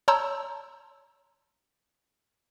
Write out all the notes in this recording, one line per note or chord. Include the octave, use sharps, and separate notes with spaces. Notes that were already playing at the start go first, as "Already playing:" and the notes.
C#5 A5 A#5 C6 E6 G6